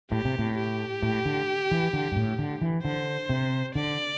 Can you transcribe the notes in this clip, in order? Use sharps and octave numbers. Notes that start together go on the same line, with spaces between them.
A2 G4
C3
A2
G4
A2
D3
E3
D3
G2
A2
D3
E3
D3 C5
C3
D3 D5